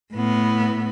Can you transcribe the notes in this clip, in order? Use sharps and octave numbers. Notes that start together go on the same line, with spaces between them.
A2 B3